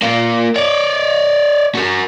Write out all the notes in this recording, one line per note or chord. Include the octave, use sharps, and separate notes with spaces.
A#3 F4
C#5 D5
F#4 A#4